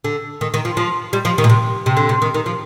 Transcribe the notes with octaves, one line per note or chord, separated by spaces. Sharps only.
D3
D#3
D#3
F3
F3
G3
F3
D#3
A#2
C3
C3
D3
C3
D#3
D#3
F3